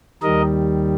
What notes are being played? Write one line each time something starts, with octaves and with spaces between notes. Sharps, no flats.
D#2 D#3 G3 A#4 D#5